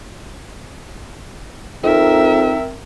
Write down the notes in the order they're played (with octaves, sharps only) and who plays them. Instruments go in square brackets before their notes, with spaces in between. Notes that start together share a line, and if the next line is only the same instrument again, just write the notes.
[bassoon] F2 [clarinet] C4 [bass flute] D#4 [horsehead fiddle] A#4 E5